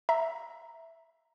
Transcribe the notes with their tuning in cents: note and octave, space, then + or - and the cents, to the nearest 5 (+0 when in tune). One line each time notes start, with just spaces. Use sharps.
E5 +0 A#5 +0